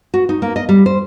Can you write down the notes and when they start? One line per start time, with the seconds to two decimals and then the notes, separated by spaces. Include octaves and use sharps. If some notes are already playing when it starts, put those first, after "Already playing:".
0.14 F#4
0.29 D#4
0.42 A#3
0.56 D#5
0.69 G3
0.86 C5